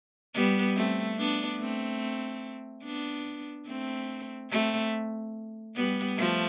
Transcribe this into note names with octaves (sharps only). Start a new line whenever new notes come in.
G3 B3
A3 C4
B3 D4
A3 C4
B3 D4
A3 C4
A3 C4
G3 B3
F3 A3